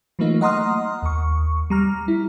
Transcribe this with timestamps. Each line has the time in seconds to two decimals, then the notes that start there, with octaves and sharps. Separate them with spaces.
0.19 E3 F#3 A3 A#3 D#4 F4
0.41 D#5 F#5 A#5 C6 D#6 F6
1.03 D#2 C#6
1.70 G3 A#5 F6
2.08 E4